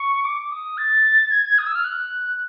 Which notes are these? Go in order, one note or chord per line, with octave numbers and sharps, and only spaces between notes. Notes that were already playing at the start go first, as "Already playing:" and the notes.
Already playing: C#6
D6
D#6
A6
G#6
D#6
E6
F6
F#6